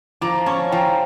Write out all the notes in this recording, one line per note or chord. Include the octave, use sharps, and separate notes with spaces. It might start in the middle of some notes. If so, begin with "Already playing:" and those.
F3 A#5 D6
C#4 A5 C#6
F3 G5 A#5